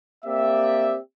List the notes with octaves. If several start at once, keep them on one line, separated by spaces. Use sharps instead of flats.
A#3 C4 G4 D5 E5